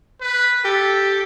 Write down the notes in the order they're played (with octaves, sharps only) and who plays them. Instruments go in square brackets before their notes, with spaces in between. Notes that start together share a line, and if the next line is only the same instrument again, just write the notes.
[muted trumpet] B4
[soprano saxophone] G4 [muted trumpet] A4